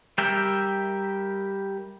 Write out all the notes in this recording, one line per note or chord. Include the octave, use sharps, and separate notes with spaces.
G3 G4 A#4 E5 G5